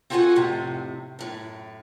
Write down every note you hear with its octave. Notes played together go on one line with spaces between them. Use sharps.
C4 F4 F#4 A4 F#5 G#5
F2 A2 C3
F#2 A2